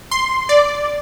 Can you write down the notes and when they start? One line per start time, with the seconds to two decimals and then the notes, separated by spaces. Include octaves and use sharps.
0.11 C6
0.49 D5